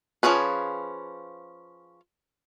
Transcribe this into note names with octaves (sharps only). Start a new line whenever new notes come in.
F3 F#3 C#4 G#4 B4